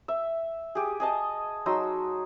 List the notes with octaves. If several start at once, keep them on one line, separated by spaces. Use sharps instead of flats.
E5
G4 G#4
G#4 D#5 A5
F#3 D#4 C6 E6